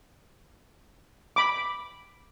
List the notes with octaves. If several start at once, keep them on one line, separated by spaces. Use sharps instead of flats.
B5 D6